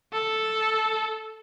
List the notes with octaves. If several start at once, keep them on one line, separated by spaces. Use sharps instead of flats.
A4